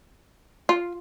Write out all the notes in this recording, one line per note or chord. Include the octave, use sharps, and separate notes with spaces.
F4